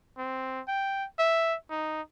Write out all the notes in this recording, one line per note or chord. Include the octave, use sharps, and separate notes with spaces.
C4
G5
E5
D#4